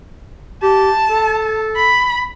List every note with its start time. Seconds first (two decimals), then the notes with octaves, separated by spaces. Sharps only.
0.62 G4 A5
1.10 A4
1.76 B5